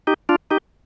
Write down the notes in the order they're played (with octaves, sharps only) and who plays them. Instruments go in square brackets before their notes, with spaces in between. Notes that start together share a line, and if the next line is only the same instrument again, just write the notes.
[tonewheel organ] D#4 G4
D4 F4
D#4 G4